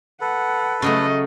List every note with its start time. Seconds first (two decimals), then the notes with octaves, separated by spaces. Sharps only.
0.21 A4 B4 F#5
0.82 C#3 F#3 A3 D#5